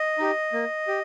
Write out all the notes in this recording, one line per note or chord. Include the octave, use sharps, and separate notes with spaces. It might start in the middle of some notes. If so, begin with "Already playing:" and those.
Already playing: D#5
D#4 G4
A#3
G4